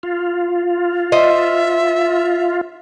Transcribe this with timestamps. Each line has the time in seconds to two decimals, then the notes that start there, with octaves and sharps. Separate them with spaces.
0.03 F4
1.12 C5 D#5 E5